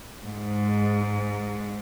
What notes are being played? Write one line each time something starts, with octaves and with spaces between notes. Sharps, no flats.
G#2